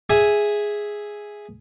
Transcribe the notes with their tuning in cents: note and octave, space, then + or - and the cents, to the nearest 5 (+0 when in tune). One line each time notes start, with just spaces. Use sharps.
G#4 +0 E5 +0 G#5 +0